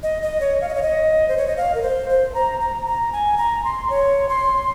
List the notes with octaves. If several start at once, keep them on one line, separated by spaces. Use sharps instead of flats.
D#5
D#5
C#5
F5
D#5
C#5
D#5
C5
C#5
D#5
F5
A#4
C5
C5
A#5
A#5
A#5
G#5
A#5
C6
C#5
C6